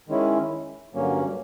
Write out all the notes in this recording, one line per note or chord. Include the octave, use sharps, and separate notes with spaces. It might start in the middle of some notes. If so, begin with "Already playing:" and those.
D#3 G#3 C#4 E4
G2 D3 F#3 A#3 C#4